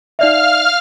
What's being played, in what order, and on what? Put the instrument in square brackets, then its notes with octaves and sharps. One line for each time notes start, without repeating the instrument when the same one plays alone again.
[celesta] D#4 D5 E5 [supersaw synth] F5 F6